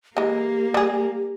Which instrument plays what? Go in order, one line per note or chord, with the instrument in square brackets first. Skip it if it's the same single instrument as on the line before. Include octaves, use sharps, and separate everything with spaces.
[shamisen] E3 G#3 [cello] A#3 [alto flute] G4
[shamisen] G3 G#4